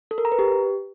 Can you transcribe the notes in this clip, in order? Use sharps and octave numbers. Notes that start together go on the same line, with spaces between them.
A4
A#4
A#5
B4
G4